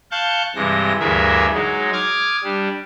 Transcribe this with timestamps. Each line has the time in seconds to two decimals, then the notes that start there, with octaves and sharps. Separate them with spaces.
0.11 F5 A5 C#6 F#6 G6 A6
0.56 G2 C3 E3 G#3 A#6
1.00 D2 G2 E3 G#4 A#4 E5
1.54 F#3 G#3 D#4
1.93 D6 D#6 F6 G#6
2.44 G3 D4